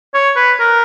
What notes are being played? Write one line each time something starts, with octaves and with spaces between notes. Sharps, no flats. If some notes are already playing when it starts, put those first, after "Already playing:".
C#5
B4
A#4